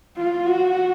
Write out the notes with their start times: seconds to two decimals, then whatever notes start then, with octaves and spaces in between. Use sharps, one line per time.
0.17 F4
0.45 F#4